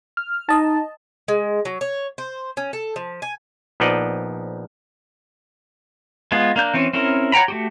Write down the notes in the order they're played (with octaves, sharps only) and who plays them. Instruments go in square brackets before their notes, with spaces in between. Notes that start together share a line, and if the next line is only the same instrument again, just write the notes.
[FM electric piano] F6
[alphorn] D#4 [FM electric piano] D#5 A5
[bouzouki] G#3
F#3
C#5
C5
C#4
A4
F3
G#5
[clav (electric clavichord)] A#1 F3 B3 D#4 D5 D#5
[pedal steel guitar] G#3 B3 F4
A#3 D4 G6
E3 C4 C#4
C4 C#4 E4 A#4
C#5 F#5 G5 A#5 B5
A3 F#4 G4